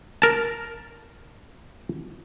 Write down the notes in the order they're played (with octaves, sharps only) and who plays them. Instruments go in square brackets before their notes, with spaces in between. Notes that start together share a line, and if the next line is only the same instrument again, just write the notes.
[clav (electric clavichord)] A#4 A5